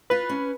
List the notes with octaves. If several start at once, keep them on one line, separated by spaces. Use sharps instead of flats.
F4 B4
C#4